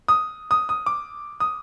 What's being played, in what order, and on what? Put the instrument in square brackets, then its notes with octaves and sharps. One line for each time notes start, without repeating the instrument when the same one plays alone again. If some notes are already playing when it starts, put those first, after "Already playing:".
[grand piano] D#6
D#6
D#6
D6
D#6